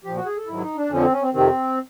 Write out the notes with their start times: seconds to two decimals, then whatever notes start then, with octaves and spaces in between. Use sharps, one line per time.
0.04 A#2 F3 G4
0.16 F#4
0.26 G#4
0.37 A4
0.47 G#2 D#3 F#3 E4
0.61 D#4
0.76 D4
0.90 F2 D3 F3 C#4
1.01 C4
1.12 C#4
1.22 C4
1.33 F2 C3 D#3 C4